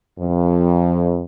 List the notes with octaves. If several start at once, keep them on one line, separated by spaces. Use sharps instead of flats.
F2